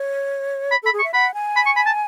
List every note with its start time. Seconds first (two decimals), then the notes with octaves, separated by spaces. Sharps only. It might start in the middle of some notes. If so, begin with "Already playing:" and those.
Already playing: C#5
0.72 B5
0.83 A4 B5
0.93 G#4
0.99 C#6
1.04 E5
1.14 F#5 B5
1.34 G#5
1.56 B5
1.66 C#6
1.76 B5
1.86 A5